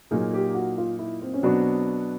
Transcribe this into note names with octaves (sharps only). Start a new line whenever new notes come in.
A#2 F#3 A#3 D#4 G#4
G4
F#4
F4
E4
C4
C#4
B2 F#3 B3 C4 D4 F#4